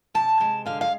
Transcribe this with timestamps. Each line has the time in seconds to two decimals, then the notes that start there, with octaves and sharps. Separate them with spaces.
0.14 C3 A5
0.40 G#3
0.66 D3 F5
0.81 F5